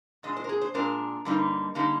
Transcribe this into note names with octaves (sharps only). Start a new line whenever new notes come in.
A#2 G#3 D4 D#5
C5
A#4
G#4
C5
A#2 G#3 D4 A#4
G2 D3 G3 A#3 D#4
D3 G3 A#3 D#4 G4